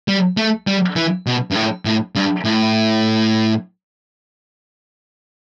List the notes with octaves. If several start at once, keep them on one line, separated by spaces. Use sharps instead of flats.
G3
A3
G3
E3
B2
G2
A2
A2
G2
A2